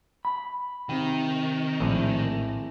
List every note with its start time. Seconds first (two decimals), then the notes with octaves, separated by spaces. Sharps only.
0.25 B5
0.89 C3 D#3 G5
1.80 A#1 A2 G#3 E4 A4